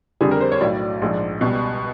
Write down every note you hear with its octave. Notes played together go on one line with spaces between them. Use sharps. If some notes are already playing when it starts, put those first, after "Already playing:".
F2 D3 G3 G#4
A#4
C5
C#5
B1 A2 F#3 D5
A#1 G#2 F3 G#3
C#2 B2 G3